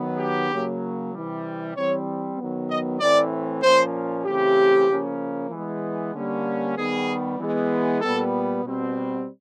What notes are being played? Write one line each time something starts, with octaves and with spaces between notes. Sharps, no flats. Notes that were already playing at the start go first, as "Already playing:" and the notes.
Already playing: D#3 F#3 B3
G4
C#3 F#3 A#3
C3 E3 G3
E3 G3 C4 C#5
D#3 F#3 B3
D#5
A2 E3 A3 C4 D5
A#2 F3 A#3 C#4 C5
C#3 E3 A3 C4 G4
C#3 F3 A#3 C#4
E3 G#3 B3
D3 G3 A#3 C#4
D#3 G3 B3 G#4
E3 G#3 B3
A#2 G3 B3 A4
B2 G3 C4